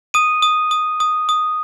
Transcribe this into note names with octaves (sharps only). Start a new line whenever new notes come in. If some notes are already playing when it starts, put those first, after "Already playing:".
D#6 D#7
D#6
D#6
D#6
D#6